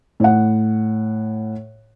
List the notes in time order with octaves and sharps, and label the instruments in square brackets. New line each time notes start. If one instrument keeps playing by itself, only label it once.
[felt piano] A2 F#5